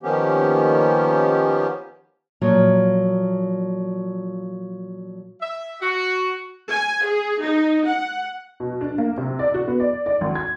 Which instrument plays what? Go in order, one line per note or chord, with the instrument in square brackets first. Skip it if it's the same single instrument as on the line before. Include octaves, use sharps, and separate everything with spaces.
[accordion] D#3 F3 A#3 B3 C#4 G4
[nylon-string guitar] A#2 F3 F#3 F4
[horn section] E5
F#4
[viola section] G#5
G#4
D#4
F#5
[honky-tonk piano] B2
D4
A#3
C3
D5
F#4
B3
D5
D5
G#1
G#6